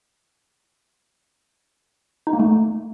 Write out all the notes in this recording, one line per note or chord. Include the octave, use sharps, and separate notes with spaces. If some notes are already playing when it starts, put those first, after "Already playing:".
D#4
A#3
A3